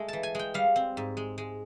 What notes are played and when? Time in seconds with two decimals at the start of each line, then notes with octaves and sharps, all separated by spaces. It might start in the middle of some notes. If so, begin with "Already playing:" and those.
Already playing: G#3 A3
0.08 E3 A5
0.23 G#5
0.35 G#3 G5
0.54 G3 F5
0.76 C4
0.97 G#2
1.17 G#3
1.38 G#3